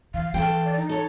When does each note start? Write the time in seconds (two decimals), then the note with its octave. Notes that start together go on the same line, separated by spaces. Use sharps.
0.14 E3 F5
0.34 E3 A4 F5 G5
0.65 D5
0.77 D#4
0.89 A4 C#5